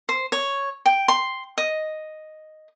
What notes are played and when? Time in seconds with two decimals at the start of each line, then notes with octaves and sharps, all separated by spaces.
0.09 C5
0.32 C#5
0.86 G5
1.08 C6
1.58 D#5